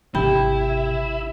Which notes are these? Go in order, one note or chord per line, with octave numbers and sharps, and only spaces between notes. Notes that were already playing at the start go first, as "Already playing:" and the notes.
G#1 C3 E4 G4 G5 B5